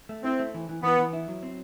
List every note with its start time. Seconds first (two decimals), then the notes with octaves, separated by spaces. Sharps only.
0.09 A3
0.24 C4 E4
0.39 A3
0.54 E3
0.69 E3
0.83 E3 B3
0.99 E3
1.13 E4
1.28 F#3
1.43 C4